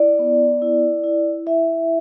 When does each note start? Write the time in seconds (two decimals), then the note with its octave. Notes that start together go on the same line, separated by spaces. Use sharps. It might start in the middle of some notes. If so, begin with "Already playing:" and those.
Already playing: E4 D5
0.19 B3
0.62 E4
1.04 E4
1.46 E4 E5